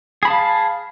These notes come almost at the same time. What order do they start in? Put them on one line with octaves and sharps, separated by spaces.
G#4 B5 A5 F5